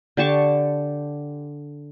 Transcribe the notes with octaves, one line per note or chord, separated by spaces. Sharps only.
D3 G4 A5 C#6